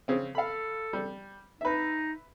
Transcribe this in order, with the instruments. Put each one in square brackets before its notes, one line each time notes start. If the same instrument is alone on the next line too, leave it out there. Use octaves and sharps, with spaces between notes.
[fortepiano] C#3 C4
[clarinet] A4 [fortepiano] F5 B5
[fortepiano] G3
[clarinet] D#4 [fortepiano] B4 E5